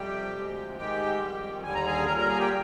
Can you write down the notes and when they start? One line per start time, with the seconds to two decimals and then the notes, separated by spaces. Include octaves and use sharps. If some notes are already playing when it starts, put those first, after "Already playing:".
Already playing: F2 C3 G3 G4 G5
0.34 D2 C3 F3 G#3
0.77 G#2 D#3 G#3 G4 G5
1.20 F2 D#3 G3
1.63 D#2 D3 G3 G#5
1.75 A#5
1.86 G#4 G#5
2.07 A#2 G3 A#4 A#5
2.17 A#4 A#5
2.28 G#4 G#5
2.39 G4 G5